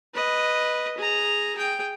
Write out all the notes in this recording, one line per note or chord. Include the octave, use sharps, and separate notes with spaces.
B4 D#5
G#4 A#5
G#4 G5